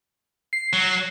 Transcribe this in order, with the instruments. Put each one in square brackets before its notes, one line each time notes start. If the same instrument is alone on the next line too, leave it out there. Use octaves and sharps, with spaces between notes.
[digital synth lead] C7
[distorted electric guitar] F#3